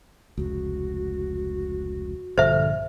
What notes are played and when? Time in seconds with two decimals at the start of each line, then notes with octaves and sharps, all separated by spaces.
0.38 F1 C#2 F#4
2.38 A#1 G2 D3 C5 E5 F6